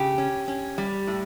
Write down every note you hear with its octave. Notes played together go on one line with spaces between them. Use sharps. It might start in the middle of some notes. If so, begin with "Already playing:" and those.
Already playing: C#3 G4
C#4
C#4
G3
A2